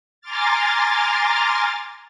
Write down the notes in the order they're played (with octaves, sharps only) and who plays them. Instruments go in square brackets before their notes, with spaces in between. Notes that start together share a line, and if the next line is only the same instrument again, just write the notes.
[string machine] G#5 A#5 C6 D6 F6 A6